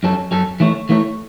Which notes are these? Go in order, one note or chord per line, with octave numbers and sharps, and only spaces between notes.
F#2 F#3 C#4 A4
F#2 F#3 C#4 A4
E3 A3 E4 C#5
E3 A3 E4 C#5